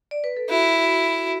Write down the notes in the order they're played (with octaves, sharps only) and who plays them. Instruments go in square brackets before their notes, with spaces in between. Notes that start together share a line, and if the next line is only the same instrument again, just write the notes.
[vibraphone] D5
B4
A4
[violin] E4 [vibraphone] F#4